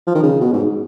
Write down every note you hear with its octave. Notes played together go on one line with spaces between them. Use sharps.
F3
D#3
C#3
B2
G#2